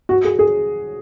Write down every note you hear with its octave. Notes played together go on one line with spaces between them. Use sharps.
F#4
G#4
G#4